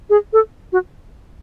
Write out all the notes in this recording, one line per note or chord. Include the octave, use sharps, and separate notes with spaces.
G#4
A4
F#4